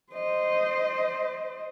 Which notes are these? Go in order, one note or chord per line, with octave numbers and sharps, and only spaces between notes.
C5 D#5